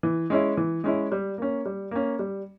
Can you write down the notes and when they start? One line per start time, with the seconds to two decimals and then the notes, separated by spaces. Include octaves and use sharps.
0.03 E3
0.30 G#3 C#4 E4
0.57 E3
0.84 G#3 C#4 E4
1.12 G3
1.38 A#3 C#4
1.65 G3
1.91 A#3 C#4
2.19 G3